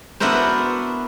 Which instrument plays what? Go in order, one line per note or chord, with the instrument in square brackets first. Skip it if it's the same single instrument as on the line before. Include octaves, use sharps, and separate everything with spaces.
[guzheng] B3 D4 E4 F#4 A#4 C5